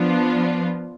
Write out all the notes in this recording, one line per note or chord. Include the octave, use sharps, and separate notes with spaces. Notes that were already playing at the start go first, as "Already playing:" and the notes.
Already playing: F3 B3 D4 F4